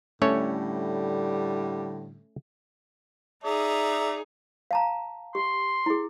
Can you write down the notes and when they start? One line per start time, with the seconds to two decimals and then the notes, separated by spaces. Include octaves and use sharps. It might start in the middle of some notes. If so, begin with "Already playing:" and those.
0.22 A2 D3 G3 A3 C#4 C#5
3.44 D#4 G#4 D5 E5 A#5
4.71 F5 A5 A#5
5.35 G4 C6
5.86 E4 G#4